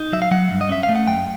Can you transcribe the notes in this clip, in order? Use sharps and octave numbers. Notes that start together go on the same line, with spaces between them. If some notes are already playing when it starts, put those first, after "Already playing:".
Already playing: D#4
F#3 E5
F5
F#3 F#5
G2
D#5
C#4 E5
F5
A3
F#5
F#2 G5